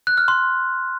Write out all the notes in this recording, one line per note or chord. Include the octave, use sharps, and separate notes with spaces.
F#6
F6
C6